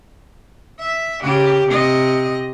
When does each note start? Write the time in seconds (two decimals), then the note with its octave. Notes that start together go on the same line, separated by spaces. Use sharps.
0.80 E5
1.24 C#3 G4
1.68 C3 D#5